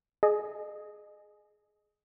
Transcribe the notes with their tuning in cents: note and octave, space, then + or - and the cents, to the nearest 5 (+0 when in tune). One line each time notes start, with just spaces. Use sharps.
G#4 +20 D#5 -25